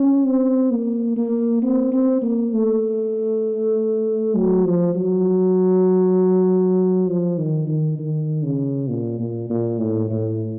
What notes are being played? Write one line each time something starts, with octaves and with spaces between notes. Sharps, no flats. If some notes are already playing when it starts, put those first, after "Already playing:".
Already playing: C#4
C4
A#3
A#3
C4
C4
A#3
A3
F#3
F3
F#3
F3
D#3
D#3
D#3
C#3
A#2
A#2
A#2
A2
A2